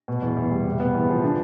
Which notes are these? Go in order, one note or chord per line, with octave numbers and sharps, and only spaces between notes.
B2
E2
E2
G3
C3
B3
E2
F3
D3